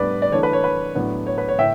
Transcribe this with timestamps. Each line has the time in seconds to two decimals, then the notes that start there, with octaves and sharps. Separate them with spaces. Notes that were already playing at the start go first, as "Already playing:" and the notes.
Already playing: A2 G3 B3 D4 B4 D5
0.22 D5
0.32 E3 A3 D4 C#5
0.43 B4
0.53 C#5
0.64 B4
0.95 A2 F#3 B3 D4
1.27 C#5
1.38 B4
1.48 C#5
1.59 A2 E5 G5